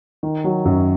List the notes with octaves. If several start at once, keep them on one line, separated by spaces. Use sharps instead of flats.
D#3
F#3
F#2